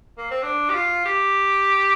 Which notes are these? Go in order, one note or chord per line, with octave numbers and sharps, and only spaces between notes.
A#3
C4
D4
G4
F4
G4